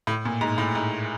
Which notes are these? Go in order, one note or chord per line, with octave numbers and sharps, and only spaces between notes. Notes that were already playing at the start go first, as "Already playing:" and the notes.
A2
A#2
G#2
A2
G#2